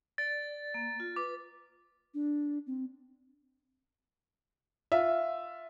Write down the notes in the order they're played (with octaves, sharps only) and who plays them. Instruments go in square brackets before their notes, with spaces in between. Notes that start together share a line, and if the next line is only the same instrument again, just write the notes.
[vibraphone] D5 [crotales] A6
[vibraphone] A#3
F4
[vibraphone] B4 [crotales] D6
[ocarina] D4
C4
[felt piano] F4 E5